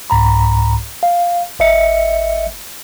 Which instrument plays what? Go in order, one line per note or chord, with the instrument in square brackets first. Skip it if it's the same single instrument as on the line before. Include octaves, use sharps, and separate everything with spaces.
[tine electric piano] C2 G#2 A#5 B5
F5
G#1 D#5 E5 C#7